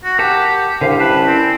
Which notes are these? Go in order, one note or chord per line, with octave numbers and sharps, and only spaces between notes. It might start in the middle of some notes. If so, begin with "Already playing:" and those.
F#4
G4 A#4 F#5 A5
C2 D3 F5
C#4 E4 B4 A5
C4